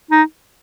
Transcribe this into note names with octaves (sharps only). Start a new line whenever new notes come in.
D#4